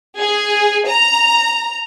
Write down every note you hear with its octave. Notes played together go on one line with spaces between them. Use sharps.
G#4
A#5